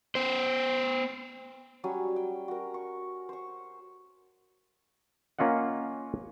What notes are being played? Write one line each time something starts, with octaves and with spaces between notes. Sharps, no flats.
B3 C5
F#3 G3 C#4 G#5
G5
F#4 A#4
C#6
C5 C#6
A#3 C#4 F4 D#5 F#5